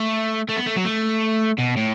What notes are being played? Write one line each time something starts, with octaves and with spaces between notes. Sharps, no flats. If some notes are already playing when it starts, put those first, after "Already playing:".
Already playing: A3
A3
B3
A3
F#3
A3
B2
A2